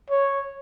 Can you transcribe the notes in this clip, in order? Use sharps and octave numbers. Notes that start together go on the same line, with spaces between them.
C#5